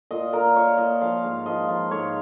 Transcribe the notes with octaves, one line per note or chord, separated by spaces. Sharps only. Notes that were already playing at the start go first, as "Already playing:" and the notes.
A#2 D#5
A#2 A#4
A#2 C#5
A#2 D#5
F3 F5
G#2
F3 D#5
F3
G#2 C#5